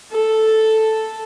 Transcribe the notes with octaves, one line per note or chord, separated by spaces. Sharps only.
A4